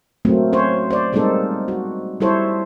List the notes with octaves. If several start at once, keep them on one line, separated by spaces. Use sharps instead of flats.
F#3 A3 A#3 C4
C#4 C5 C#5
C5 D5
G3 G#3 A#3 C4 D#4 A4
F#4
G3 E4 A4 C5 C#5